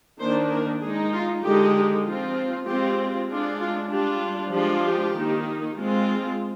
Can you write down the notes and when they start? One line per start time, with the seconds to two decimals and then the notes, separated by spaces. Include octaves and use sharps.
0.20 D#3 A#3 D4 C5
0.51 A#4
0.82 G#3 D#4 G#4
1.12 F4
1.44 D3 G#3 D#4 G4
2.05 F3 C4 F4
2.67 G#3 C4 F4 G4
3.30 G#3 D4 F4
3.61 F4
3.91 G3 D4 F4 G4
4.52 F3 G#3 D4 F4 G4
4.84 G4
5.14 D#3 A#3 D#4
5.76 G#3 C4 F4